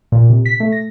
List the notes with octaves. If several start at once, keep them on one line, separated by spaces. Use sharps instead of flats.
A#2
C3
B6
A3
A#6